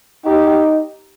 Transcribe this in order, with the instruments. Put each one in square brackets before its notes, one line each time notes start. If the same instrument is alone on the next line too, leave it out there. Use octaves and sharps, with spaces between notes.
[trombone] D#4 [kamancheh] G4